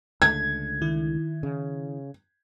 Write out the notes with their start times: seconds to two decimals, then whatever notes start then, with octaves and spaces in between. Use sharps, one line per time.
0.22 C#2 D3 A3 G#6
0.82 D#3 E4
1.43 C#3